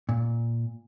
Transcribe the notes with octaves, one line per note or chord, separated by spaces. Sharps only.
A#2